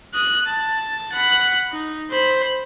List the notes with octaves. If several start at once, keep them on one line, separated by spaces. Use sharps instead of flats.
D#6 F#6
A5
F#5 B5
D#4
C5 B5